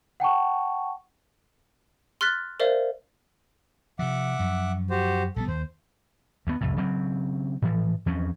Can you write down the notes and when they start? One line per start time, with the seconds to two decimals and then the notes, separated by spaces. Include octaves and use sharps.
0.20 F#5 G5 A5 C#6
2.21 C6 F6 F#6 A6 B6
2.60 A#4 C5 D5 E5 F5
3.99 C3 F3 E5 F#5 D6
4.39 F#2 F3
4.90 F#4 G4 C5
5.36 A#1 G3 B3 A4
5.48 D#2 C5
6.47 D2 B3
6.61 C2 F2 A2
6.76 C#3 F#3 C4
7.62 A2 E3 F3
8.06 E2 F3 C4 C#4